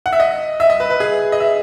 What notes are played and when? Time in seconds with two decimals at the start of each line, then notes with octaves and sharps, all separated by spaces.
0.06 F#5
0.13 E5
0.20 D#5
0.60 E5
0.70 D#5
0.80 B4
0.90 B4
1.00 G#4
1.32 D#5
1.40 E5